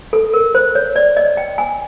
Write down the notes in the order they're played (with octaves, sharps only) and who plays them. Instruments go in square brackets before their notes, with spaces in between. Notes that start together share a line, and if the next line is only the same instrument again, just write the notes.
[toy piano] A4
A#4
C5
C#5
D5
D#5
G5
G#5